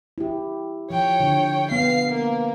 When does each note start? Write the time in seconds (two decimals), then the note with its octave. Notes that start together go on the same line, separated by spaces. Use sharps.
0.18 E4 G4
0.90 F3 C#5 G5
1.20 D3
1.71 B3 F5 C7
2.08 A#3